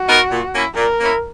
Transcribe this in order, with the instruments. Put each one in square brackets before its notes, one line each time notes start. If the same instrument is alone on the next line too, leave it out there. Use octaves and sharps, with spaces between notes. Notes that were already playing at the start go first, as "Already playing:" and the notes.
Already playing: [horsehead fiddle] F#4
[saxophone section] B3 D#4 A#4
A#2
A#3 C#4 E4
[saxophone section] A#2 [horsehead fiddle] A#4
[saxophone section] A#3 C#4 E4